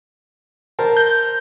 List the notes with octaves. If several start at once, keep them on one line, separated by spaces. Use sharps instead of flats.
A#4 C5 A5
G6